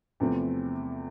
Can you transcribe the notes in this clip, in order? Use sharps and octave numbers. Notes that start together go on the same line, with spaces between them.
E2 C3 F3 A3 C4